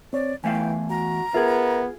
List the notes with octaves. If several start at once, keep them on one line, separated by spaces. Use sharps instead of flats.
C4 C#5 D5
E2 E3 A3 F5 G5 G#5
F#4 A#5
B3 F4 G#4 A#4 E5